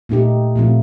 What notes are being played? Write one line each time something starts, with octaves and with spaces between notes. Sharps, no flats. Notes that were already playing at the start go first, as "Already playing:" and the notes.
A#2 A3 D#4 G4
A#2 F3 A3 C4 F4